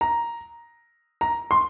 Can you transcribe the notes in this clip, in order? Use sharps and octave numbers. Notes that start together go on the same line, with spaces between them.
A#5
A#5
C6